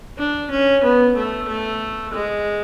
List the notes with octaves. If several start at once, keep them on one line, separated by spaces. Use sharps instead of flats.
D4
C#4
B3
A3
A3
G#3